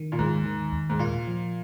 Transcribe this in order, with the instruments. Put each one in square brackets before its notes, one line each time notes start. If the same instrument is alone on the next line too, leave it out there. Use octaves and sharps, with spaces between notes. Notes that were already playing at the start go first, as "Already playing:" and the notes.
Already playing: [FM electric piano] D#3
[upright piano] A#2
[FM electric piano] D#2 [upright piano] G#2
[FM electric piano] D#3
D#2
[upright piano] G#2
[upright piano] A#2 [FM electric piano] F4
[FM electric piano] F3